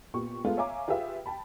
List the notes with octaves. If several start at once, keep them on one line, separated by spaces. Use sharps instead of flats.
A#2 B3 G4 C#6
G#3 A3 B3 F4
C#5 E5 F5 G#5 A#5 D6
F4 G4 G#4 B4 E5 G5
G5 A5 B5